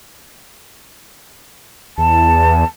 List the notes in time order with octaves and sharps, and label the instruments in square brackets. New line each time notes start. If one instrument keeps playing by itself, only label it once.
[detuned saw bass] E2 [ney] A5